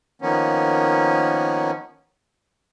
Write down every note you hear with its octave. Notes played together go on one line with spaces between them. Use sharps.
D#3 F3 A#3 B3 C#4